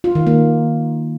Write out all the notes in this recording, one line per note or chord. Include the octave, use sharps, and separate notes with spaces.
F4
D#3
A#3